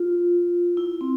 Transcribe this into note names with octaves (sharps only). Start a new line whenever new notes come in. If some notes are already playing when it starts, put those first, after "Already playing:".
Already playing: F4
E4
C4